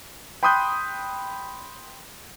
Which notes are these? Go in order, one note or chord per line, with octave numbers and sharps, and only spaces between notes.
G5 B5 C6 D#6 F#6 G6